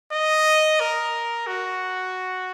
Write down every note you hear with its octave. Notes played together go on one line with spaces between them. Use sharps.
D#5
A#4
F#4